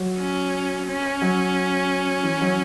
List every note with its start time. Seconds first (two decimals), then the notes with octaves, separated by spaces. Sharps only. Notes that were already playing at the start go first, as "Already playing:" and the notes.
Already playing: F#3
0.18 C#4
0.87 C#4
1.22 F#3
2.23 E3
2.41 F#3